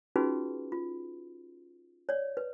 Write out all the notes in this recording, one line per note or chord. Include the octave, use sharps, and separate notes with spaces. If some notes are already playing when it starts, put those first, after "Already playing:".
C#4 D#4 F4 F#4 G#4 B4
F4
C#5 D5
B4